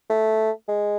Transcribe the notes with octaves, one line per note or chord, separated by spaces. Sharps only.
A3
G#3